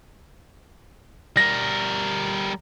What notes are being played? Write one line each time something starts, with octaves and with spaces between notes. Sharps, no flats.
G3 A#4 A#6